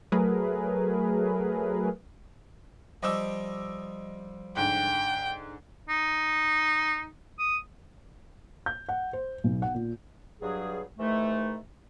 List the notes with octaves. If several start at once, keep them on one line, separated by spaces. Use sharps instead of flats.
F#3 A3 G#4 A#4 B4
F3 G3 G4 D#5 D6 E6
G#2 D3 G5
D#4
D#6
G6
F#5
C5
B1
F#5
A#2
G2 F#3 G#4
G#2 D#3 E3 A3